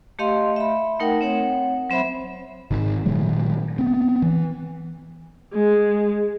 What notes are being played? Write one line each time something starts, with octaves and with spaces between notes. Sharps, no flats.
A3 G4 D#5 F5 C6
E5 B5
A3 D#4 A#4 F#5 G5
C4 C#5 F#5
F#3 C4 C5 E5 B5
G#1 D#3
A#2 D#3 F#3 G#3
B3 C4
E3
G#3